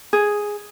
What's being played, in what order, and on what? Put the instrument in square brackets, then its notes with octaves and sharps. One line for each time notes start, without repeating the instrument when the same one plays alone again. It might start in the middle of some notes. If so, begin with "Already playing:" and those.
[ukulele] G#4